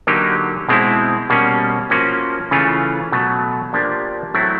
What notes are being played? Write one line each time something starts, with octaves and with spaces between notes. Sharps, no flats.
D3 F#3 A#3 D#4 G4
B2 G#3 C4 E4
B2 G3 A#3 C#4
F3 A#3 C#4 F#4
C#3 E3 A3 C#4 F4
B2 F#3 A3
F3 A#3 D4 G4
A2 F#3 A3 C4 E4